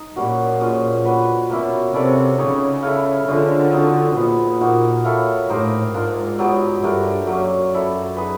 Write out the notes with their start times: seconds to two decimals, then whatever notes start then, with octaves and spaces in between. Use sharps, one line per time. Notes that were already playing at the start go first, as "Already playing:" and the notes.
Already playing: D#4
0.16 A#2 G3 A#3 C#4 F#4
0.61 F3 G#3 C#4
1.05 D4 F#4 B4
1.49 B2 A#3 C#4 E4
1.93 C3 C#4 E4 A4 D5
2.38 C#3 D#4 G#4 C#5
2.83 E4 A4 C#5 F5
3.27 D3 F3 G#3 C#4
3.72 C4 D#4 F#4
4.16 A#2 F3 G#3 B3
4.61 A#3 D#4 F#4
5.05 E4 A4 C#5 F5
5.49 A2 A#3 D#4 G4 C5
5.94 G#2 D4 F4 A#4
6.39 F#3 B3 D#4 G4
6.82 G2 A3 D4 G4 A#4
7.27 F#2 F#3 A#3 C#4
7.72 E4 A4 D5
8.16 D#4 G#4 B4